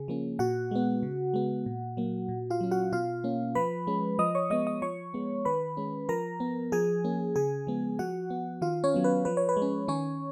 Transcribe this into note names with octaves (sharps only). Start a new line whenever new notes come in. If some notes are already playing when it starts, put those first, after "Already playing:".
Already playing: C#3 G#4
F3 A#3 C#4
A#2 F#4 F#5
G#3 B3
C#3
G#3 B3
A#2
F#3 A#3
A#2
F4 F5
F#3 C#4
F#4 F#5
B2 F4 F5
A#3 C#4
F3 B4 B5
G#3 C#4
F3 D#5 D#6
C#5 C#6
G#3 B3 D#5 D#6
D#5 D#6
F3 C#5 C#6
G#3 B3
D#3 B4 B5
G#3 C#4
F3 A#4 A#5
B3
F3 G#4 G#5
A#3 C#4
C#3 G#4 G#5
F3 G#3 B3
F3 F#4 F#5
B3
D#3 F4 F5
C#4 C#5
F#3 B3
B4
F3 B4
C#5
B4
G#3
C#4
D#3 C#4 C#5